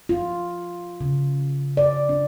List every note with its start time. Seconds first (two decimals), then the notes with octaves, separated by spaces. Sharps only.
0.09 F4
1.01 C#3
1.77 D5
2.09 D4